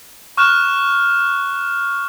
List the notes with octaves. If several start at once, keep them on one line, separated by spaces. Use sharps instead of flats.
C#6 F6 F#6 E7